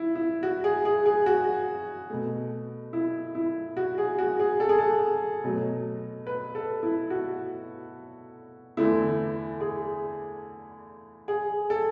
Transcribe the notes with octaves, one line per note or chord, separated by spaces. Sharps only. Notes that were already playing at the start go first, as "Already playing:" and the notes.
Already playing: E4
E4
F#4
G#4
G#4
G#4
F#4
B2 A3
E4
E4
F#4
G#4
F#4
G#4
A4
G#4
A4
B2 F#3 A3
B4
A4
E4
F#4
E2 D3 A3 E4
G#4
G#4
A4